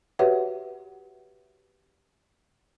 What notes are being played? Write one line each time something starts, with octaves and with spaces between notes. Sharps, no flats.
F#4 G4 B4 C#5 E5 F#5